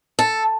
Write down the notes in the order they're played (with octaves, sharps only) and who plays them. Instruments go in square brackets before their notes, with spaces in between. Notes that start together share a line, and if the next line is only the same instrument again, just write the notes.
[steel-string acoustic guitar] A4